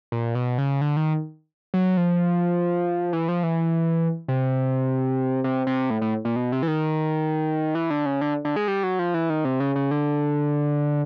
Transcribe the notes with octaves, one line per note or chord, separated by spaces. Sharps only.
A#2
B2
C#3
D3
D#3
F#3
F3
E3
F3
E3
C3
C3
C3
A2
A2
A#2
B2
C3
E3
D#3
E3
D3
C#3
D3
D3
G#3
G3
F#3
F3
E3
D#3
C3
C#3
C#3
D3